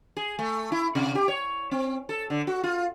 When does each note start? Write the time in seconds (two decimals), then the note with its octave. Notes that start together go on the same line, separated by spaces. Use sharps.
0.17 G#4
0.39 A3
0.72 E4
0.95 C3
1.15 G4
1.28 C#5
1.71 C4
2.09 A4
2.30 D3
2.47 F#4
2.63 F4